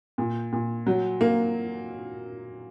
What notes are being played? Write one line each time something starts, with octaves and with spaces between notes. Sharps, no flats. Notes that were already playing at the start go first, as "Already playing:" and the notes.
A#2
A#2
F#3
A#3